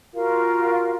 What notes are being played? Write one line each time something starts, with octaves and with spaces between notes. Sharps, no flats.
F4 F#4 A#4 F5